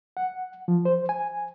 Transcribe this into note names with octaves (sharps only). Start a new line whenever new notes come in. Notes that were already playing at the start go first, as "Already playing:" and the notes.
F#5
F3
C5
G#5